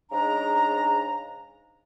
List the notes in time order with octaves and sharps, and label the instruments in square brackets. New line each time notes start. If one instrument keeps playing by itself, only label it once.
[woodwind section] G#2 C#3 D4 A#5